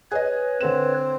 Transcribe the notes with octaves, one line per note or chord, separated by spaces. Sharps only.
G#4 B4 C#5 D#5
D3 A3 C4 E7